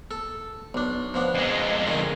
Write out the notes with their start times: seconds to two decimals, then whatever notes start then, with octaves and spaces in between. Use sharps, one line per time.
0.11 A4
0.74 B1 D4
1.14 F3 B3 D4
1.35 F2 G#3
1.87 D3 D#3